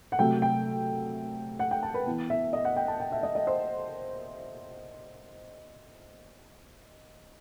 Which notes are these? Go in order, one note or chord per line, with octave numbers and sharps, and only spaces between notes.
F#5
C3 F#3 A3 G5
G5
F#5
G5
A5
B4
E3 B3
E5
D#5
F#5
G5
A5
G5
E5
D#5
D#5
C5